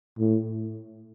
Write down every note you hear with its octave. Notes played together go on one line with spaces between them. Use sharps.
A2